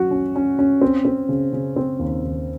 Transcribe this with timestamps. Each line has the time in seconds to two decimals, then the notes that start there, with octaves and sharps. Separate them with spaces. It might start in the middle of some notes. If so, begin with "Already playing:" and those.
Already playing: F#3 C#4 F#4
0.11 C#4
0.36 C#4
0.59 C#4
0.81 C4
1.05 C4
1.29 C#3
1.53 C#3
1.76 C4
1.99 D#2
2.23 D#2